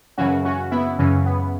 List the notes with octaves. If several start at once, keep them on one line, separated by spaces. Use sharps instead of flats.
F#2 C#3 E3 C#4 F#4
C#4 F#4
B3 E4
F#2 C#3 E3 C#4
B3